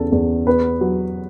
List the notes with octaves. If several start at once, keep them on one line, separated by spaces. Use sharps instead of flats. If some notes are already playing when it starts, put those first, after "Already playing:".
Already playing: E2 C#3 A4
E2
B3 B4
F#3